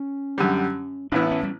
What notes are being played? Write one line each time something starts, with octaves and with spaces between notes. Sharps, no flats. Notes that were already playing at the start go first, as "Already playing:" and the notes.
Already playing: C#4
F#2 D3 G3
A1 A2 E3 B3 D4 E4
C#4
G3